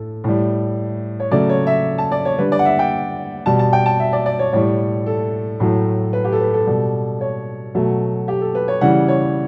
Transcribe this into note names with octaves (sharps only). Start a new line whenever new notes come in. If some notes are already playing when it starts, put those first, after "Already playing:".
Already playing: A2 A4
A2 G3
C#5
C#3 F#3 A3 D5
C#5
E5
A5
D5
C#5
D3 G3 B4
D5
F#5
E5
G5
B2 G3 A5
A5
G5
A5
E5
D5
D5
C#5
A2 G3 C#5
A4
A2 F#3 A3
B4
G4
A4
B4
A4
B2 G3
C#5
B2 F#3 A3
G4
A4
B4
C#5
C#3 E3 G3 F#5
C#5